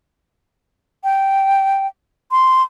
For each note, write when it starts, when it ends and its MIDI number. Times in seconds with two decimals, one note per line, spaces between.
1.04 1.87 79
2.31 2.63 84